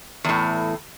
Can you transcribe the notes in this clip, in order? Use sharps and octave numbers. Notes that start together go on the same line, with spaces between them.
E2 A2